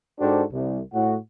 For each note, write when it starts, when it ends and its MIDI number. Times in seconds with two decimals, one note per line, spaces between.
0.20 0.44 44
0.20 0.44 62
0.20 0.44 66
0.20 0.44 67
0.20 0.44 69
0.20 0.44 72
0.53 0.82 36
0.94 1.17 45
0.94 1.17 66